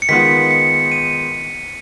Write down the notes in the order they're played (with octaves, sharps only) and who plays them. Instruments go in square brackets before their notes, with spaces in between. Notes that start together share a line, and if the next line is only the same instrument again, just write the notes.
[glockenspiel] C#7
[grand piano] D#3 G#3 B3 F4 [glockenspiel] B6
[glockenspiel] C#7
D#7